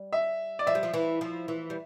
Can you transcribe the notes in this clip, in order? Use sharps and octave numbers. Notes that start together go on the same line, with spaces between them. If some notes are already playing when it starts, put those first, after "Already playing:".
Already playing: G3
E5
D5
F3 E5
G3
F3
E3
F3
E3
G3